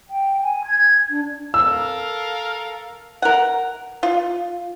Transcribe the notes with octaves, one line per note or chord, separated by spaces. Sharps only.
G5
G#5
G#6
D4
A4 A#4 F5 E6
A#4 F#5
F4